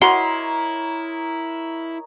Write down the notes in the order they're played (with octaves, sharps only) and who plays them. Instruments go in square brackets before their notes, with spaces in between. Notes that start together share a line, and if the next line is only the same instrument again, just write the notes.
[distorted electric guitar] E4 [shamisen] F#4 F#5 [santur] A#4 C#5 D#5 [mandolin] C6